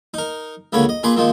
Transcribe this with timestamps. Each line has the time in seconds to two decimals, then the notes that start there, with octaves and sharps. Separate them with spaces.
0.14 D#4 A#4
0.73 C#2 D3 A#3 B4 C#5
0.89 D#5
1.03 A#2 G#4 B4 C6 D6
1.16 A#2 D#3 F3 G#3